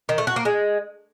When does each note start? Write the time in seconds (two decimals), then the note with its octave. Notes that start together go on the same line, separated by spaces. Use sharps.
0.09 D#3
0.18 A3
0.27 F#4
0.36 A#3
0.45 G#3